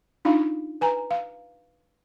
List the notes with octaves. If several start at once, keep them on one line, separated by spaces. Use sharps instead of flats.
D4 D#4 F4 F5
B4 G#5 A#5
F5